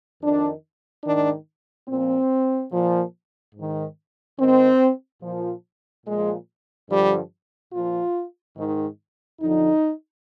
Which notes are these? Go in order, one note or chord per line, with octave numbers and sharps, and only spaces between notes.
F2 D#3 D4
G#2 D#3 D4
A#2 F3 C4
A#2 F3
G#2 D#3
G#2 D#3 C4
A#2 F3
A#2 F3 G#3
G2 D3 F3 G3
A#2 F3 F4
G#2 D#3
F2 D3 F3 D#4